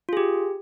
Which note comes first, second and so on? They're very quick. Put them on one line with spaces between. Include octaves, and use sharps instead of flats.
F4 G#4 G4